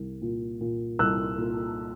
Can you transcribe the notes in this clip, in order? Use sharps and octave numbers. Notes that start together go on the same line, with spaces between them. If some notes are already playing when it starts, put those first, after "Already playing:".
Already playing: C2
A#2
A#2
C2 E6 F#6
A#2